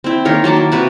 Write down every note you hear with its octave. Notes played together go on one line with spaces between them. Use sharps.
C4 E4
D#3 A#3 A#4 C#5
F#3 A#3 A5 D6
E4
C3 F#4 B4